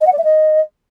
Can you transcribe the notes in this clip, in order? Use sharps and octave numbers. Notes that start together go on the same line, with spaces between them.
D#5
F#5
D5
E5
D#5